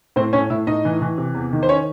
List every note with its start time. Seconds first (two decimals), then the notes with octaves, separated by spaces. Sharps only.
0.16 A2 C4 C5
0.33 A2 C#4 C#5
0.50 A2 E4 E5
0.67 A2 D#4 D#5
0.85 E3
1.02 E3
1.18 C3
1.35 E2
1.52 D#3
1.63 C5
1.69 C#4 C#5